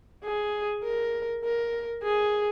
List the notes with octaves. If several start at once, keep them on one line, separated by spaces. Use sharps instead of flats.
G#4
A#4
A#4
G#4